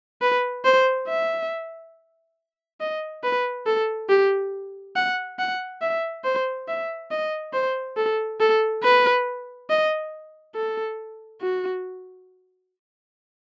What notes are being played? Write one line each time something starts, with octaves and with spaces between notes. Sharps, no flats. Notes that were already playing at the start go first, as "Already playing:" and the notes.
B4
C5
E5
D#5
B4
A4
G4
F#5
F#5
E5
C5
E5
D#5
C5
A4
A4
B4
D#5
A4
F#4